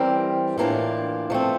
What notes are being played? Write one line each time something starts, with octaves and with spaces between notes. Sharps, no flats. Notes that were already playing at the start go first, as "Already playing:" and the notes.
Already playing: E3 G3 C4 G4 A#4
A2 E3 A#3 D4 F4
F3 A3 C4